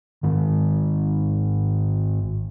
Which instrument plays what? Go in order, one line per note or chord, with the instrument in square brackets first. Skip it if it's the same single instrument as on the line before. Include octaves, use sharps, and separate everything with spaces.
[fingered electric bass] G#1 G#2 D#3